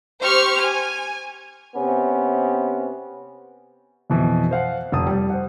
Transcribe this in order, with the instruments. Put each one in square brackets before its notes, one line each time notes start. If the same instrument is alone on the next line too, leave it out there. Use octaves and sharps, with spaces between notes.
[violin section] G4 C5 C#6 F6
G#5
[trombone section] C3 B3 C#4
[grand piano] F2 B2 E3
C5 F5 F#5
F1 A5 D#6
G3
C5 F#5